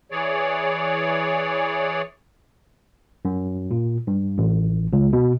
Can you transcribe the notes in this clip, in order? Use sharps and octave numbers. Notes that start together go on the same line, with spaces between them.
E3 G#4 C#5 D5
F#2
A#2
G2
A1
C#2
B2